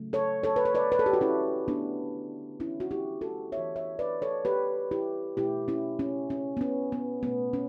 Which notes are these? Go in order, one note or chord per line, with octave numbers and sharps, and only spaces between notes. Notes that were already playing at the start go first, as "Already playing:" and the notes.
Already playing: C#3 F#3 A3
A4 C#5
A4 C#5
B4
C#5
B4 D5
B4
A4
G4
F#4
C#4 E4
D3 A3 B3 D4
C#4 E4
F#4
E4 G4
F#4 A4
E3 B3 C#5 E5
C#5 E5
B4 D5
A4 C#5
G4 B4
E4 G4
B2 A3 E4 G4
C#4 E4
C#4
C#4
B3
C#4
B3
B2 A3 B3
C#4